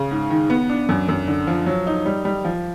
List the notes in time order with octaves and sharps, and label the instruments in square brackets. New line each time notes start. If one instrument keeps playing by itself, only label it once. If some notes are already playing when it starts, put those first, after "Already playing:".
Already playing: [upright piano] C#3
G#2
D#3
B3
D4
F#2
F#2
D3
F3
F#3
D#4
G3
G3
F3